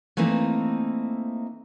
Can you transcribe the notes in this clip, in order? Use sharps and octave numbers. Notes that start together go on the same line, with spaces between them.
E3 A3 A#3 C4 D#4